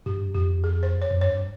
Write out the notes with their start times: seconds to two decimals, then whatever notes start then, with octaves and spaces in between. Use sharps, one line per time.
0.06 G2 G4
0.35 F2 G4
0.64 G#4
0.83 C5
1.02 C#5
1.11 F2
1.21 G2 C#5